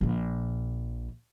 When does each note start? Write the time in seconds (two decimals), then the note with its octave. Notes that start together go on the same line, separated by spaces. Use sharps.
0.01 A#1 A#2